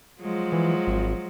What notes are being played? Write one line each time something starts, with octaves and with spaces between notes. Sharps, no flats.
F3 F#3 G#3
E3
G#1